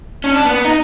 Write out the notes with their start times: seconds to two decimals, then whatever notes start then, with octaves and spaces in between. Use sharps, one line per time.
0.24 C#4
0.34 D4
0.45 B3
0.55 B3
0.64 D#4